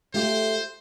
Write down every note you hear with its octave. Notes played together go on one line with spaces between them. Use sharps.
A3 F4 G4 C5